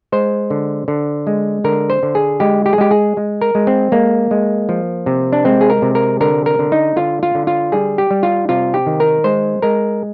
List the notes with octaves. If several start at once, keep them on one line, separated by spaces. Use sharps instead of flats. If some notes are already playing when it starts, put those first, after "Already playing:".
G#3 C5
D3
D3
G#3
D3 A#4
C5
D3
G#4
G#3 G4
G4
G#4
G#3 G4
G#4
G#3
A#4
G#3
C4
G#3 A#3
G#3
F3
C3
D4
G#3 C4
G#4
A#4
C3
A#4
D3 A#4
A#4
D3
D#4
D3 F4
F4
D3
F4
G3 G#4
G4
G3
F4
C3 F4
G4
D#3
A#4
G#3 C5
G#3 A#4